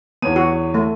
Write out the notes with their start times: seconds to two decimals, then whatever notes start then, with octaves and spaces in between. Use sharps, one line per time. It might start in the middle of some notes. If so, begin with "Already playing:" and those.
0.22 E2 B3 C#5 D#7
0.36 F#4
0.74 A3